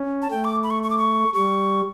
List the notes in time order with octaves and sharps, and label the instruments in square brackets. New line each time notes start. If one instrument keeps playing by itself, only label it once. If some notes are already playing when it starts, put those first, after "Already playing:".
Already playing: [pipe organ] C#4
[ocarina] A5
[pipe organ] A3 [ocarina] G5
[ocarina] D6
B5
C#6
C#6
D6
C#6
[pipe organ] G3 [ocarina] C#6